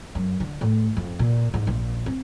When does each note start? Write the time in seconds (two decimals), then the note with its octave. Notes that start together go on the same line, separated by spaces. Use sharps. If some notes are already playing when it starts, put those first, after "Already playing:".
0.15 F#2
0.40 D3
0.61 A2
0.97 F2
1.19 A#2
1.54 G#2
1.67 A#1
2.06 C4